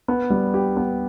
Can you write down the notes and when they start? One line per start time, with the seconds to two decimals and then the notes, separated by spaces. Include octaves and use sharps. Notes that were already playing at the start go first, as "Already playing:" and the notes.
0.08 B3
0.30 G3
0.54 G4
0.77 B3